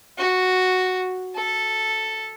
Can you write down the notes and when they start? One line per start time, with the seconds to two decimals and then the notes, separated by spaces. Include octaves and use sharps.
0.18 F#4
1.35 A4